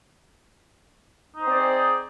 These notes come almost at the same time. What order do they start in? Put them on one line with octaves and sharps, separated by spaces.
D#4 C5 C4 D5 G#4